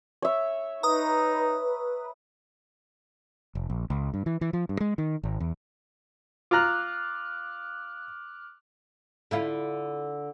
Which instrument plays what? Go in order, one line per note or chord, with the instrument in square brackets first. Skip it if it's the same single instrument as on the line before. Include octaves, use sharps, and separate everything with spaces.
[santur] C#5 E5
[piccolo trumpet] D#4 [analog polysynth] B4 [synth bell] A#5 D#6
[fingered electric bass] F1
A#1
C#2
G2
E3
E3
F3
G2
G#3
D#3
G#1
E2
[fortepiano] F4 A#5 [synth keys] D6 F6 F#6
[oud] D3 E4 F4